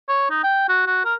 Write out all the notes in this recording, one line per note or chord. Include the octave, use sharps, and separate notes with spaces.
C#5
D#4
G5
F#4
F#4
A#4